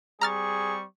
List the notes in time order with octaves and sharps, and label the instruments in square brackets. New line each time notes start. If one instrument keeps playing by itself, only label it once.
[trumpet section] G3 C4 C#6 [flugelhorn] G#4 [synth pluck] A#5 F6 A6